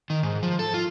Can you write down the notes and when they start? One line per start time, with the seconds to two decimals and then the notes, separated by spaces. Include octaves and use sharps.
0.10 D#3
0.23 G#2
0.43 F3
0.59 A4
0.74 F4